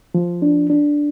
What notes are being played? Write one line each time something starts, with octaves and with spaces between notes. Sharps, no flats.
F3
D4
D4